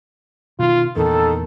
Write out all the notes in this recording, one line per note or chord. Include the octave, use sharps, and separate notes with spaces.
B2 D#3 F4
E2 A#2 D#3 A4